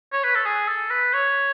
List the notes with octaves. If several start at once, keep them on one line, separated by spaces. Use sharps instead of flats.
C#5
B4
A4
G#4
A4
B4
C#5